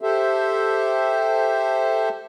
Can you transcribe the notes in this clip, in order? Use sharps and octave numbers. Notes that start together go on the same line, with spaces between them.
G4 A4 C5 E5